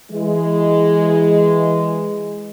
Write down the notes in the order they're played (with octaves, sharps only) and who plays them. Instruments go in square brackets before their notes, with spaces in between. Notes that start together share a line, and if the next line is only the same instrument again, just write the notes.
[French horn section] E3 G#3